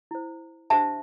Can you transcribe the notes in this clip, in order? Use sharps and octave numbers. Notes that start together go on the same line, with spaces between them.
E4 C5
D4 G4 C5 E5 A5